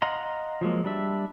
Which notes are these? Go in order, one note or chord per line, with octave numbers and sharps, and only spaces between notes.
D#5 F5 F#5 A#5 C6
F3 F#3 G#3 A#3
G3 D4 E5